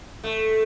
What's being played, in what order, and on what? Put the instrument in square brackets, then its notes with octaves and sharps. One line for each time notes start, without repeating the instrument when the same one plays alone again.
[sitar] A3